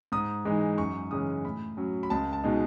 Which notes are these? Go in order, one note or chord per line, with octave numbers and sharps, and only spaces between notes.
G#2 D#6
E3 G#3 D#4
F#2 C#6
C#3 E3 G#3 C#4 D#6
A2 B5
F#3 C#4
B5
C#2 A5
A5
B2 G#3 D#4